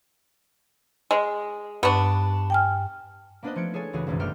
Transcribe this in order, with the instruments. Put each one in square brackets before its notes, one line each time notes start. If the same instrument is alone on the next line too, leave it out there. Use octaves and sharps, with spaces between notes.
[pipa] G#3
[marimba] G2 C#6 [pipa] B3 D4
[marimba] G5 G#5 F6
[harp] A#3 B3 D4 B4 C5 D#5
F3 A3 F4 G#6 C#7 D7
E4 G#4 A4 C#5 G#5
F#1 C#2 E3 F#4 G#4 B4
G#1 C#2 F#2 B2 E3
G1 A3 G4 G5 F6 G6